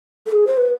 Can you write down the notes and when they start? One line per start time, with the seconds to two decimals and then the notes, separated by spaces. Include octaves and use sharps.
0.26 A4
0.32 G#4
0.47 C5
0.57 B4